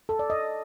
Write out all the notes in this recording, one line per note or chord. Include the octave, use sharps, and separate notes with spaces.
A4
D5
D#5